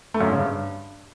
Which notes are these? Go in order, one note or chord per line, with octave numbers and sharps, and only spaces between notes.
A3
F#2
G#2
C#3
G2